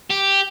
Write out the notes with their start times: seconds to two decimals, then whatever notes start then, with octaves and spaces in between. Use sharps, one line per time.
0.10 G4